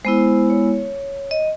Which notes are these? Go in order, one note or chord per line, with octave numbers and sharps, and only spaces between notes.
G#3 B3 E4 C5
C#5
D#5